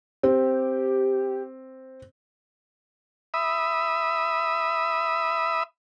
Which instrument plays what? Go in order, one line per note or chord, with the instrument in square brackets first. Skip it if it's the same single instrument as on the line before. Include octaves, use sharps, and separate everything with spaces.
[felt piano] C4 [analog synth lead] G4
[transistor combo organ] E5 B5 D#6